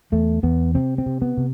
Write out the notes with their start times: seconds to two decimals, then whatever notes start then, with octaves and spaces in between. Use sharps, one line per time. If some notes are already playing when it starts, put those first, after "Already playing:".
0.12 E2 A3
0.43 E2 B3
0.75 C3 C4
0.98 C4
1.06 C3
1.22 B3
1.37 C3